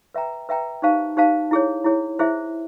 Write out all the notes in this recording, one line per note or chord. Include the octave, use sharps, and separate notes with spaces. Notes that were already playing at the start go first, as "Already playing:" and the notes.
B4 E5 G5 A#5
B4 E5 G5 A#5
D#4 G4 C5 F5 A5
D#4 G4 C5 F5 A5
E4 G#4 C#5
E4 G#4 C#5
E4 G#4 C5 E5